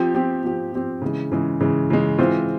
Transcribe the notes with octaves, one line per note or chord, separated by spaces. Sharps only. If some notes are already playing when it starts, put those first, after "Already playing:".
Already playing: F3 C4 G4
F3 C4 G4
F3 C4 G4
F3 C4 G4
C#3 E3 G#3
C#3 E3 G#3
C#3 E3 G#3
C#3 E3 G#3
E3 G#3 C4 F4 C5